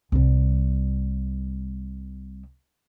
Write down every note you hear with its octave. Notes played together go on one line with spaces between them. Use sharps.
C2 G3